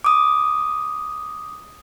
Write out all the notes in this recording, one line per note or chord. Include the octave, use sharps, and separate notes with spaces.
D6 D#6